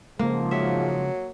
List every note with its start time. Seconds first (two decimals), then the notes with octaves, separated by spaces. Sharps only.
0.19 G#2 C#3 F3 G#3 A#3
0.51 F#3 E5